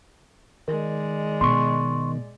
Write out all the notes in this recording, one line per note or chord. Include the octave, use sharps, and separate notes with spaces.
D#3 G#3 D5
B2 C6 C#6